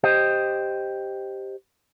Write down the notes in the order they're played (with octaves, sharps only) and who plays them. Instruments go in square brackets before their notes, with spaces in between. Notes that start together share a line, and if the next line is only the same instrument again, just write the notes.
[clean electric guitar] G4 C5 D#5